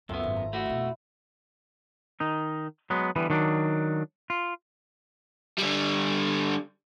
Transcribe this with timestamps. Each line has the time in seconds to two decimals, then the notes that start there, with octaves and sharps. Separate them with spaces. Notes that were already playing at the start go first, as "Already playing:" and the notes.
0.09 C#2 F#2 A3 B3 C4 F4
0.23 G#1
0.36 A#5
0.53 A3 E4 F#4
0.65 F2 B2
2.20 D#3 D#4
2.90 F#3 G#3 B3
3.16 D3 E3 G3 B3
3.30 D#3 F#3 D4
4.30 F4
5.58 D3 G3